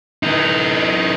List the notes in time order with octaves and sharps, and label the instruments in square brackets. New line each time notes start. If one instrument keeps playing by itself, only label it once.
[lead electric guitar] E3 D#4